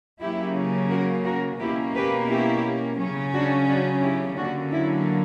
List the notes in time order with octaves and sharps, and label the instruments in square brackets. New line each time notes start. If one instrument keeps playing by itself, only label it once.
[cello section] C#3 F#3 A#3 C#4 E4 G4
F#4 A#4
F#4 A#4
B2 A#3 C#4 E4 G4
G4 B4
E4 G4
C#3 F#3 C#4
D4 F#4
D4 F#4
E4 G4
D3 F#3 A#3 C#4 D4 F#4
E4